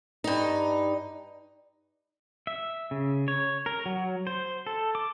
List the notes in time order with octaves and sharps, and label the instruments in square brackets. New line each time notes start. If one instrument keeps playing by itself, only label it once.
[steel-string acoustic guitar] G2 D#4
[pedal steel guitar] E5
C#3
C#5
A#4
F#3
C5
A4
D6